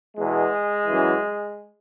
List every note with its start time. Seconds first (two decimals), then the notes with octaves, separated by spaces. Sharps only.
0.17 E2 B2 G#3
0.87 F#2 E3